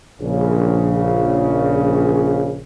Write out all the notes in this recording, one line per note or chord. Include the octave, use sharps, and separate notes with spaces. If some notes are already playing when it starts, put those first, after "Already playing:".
A#1 C#3